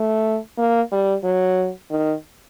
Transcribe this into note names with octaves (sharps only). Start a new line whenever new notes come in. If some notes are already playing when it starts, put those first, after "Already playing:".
Already playing: A3
A#3
G3
F#3
D#3